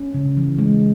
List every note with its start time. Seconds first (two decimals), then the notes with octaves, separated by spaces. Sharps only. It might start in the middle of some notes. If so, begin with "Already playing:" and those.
Already playing: C#4
0.14 C#3
0.37 E3
0.58 G#3